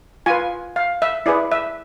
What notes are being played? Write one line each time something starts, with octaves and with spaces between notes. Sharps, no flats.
F4 B4 G#5
F5
E5
E4 G#4 B4 D5
E5